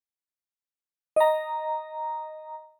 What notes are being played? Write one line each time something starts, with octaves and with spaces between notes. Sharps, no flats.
D#5 A#5